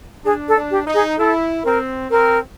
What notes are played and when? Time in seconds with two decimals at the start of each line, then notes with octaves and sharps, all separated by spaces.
0.24 D4 G#4
0.48 A4
0.55 D4
0.71 G4
0.87 D#4
0.94 G#4
1.18 E4 A4
1.64 C4 A#4
2.11 C4 A#4